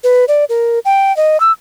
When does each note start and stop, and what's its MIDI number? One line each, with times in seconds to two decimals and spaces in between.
0.04 0.25 71
0.28 0.45 74
0.49 0.79 70
0.85 1.15 79
1.17 1.40 75
1.40 1.52 88